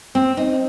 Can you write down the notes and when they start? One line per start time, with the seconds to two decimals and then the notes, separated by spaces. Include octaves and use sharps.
0.15 C4
0.37 C4 D#4